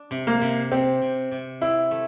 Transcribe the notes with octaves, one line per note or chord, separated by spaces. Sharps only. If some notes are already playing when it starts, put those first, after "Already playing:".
Already playing: D4
C3
A#3
C3
C3 C4
C3
C3
C4 E4
A3